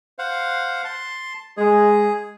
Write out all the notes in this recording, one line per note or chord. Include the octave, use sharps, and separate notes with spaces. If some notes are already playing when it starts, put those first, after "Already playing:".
C5 F5 F#5
A5 C6
G#3 G#4